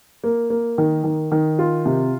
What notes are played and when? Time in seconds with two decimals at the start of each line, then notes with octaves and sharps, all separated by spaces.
0.24 A#3
0.50 A#3
0.78 D#3
1.04 D#3
1.32 D#3
1.59 F4
1.85 C3